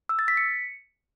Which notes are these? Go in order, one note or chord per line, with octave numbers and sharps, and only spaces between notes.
E6
A6
B6
C#7